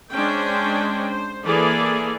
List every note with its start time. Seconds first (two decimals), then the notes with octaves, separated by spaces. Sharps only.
0.11 G#3 C#4 D4 C5 G5
1.06 C5
1.45 E3 A#3 G#4 A4 D5